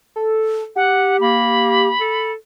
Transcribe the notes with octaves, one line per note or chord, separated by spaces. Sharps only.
A4
G4 F#5
A#3 B5
A4